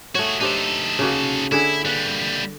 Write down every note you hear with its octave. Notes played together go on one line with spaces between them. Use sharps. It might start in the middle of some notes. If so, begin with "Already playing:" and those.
A3 F#4 G#4 C#5
D4 D#4 G4 A4 C5
C#3 A#3 F#4
D3 E4 G#4
G3 A#3 B4 F#5